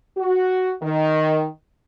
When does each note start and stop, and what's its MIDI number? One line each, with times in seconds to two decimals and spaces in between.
0.17 0.72 66
0.82 1.45 51